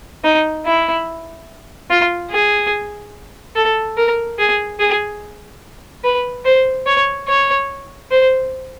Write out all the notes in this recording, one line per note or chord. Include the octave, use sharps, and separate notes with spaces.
D#4
E4
F4
G#4
A4
A#4
G#4
G#4
B4
C5
C#5
C#5
C5